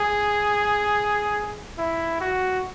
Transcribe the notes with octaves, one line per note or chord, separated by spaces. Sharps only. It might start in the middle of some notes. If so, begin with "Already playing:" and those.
Already playing: G#4
E4
F#4